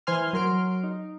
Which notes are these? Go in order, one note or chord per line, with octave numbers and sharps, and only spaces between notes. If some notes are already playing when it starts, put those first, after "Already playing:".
E3 C5 G#5 C6 F6
F#3 A#4 C6 F6 D7
D#4